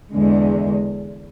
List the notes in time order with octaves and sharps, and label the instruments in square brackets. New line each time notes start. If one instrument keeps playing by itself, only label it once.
[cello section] E2 D3 G#3